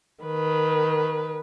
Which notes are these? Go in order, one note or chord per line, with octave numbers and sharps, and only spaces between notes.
D#3 B4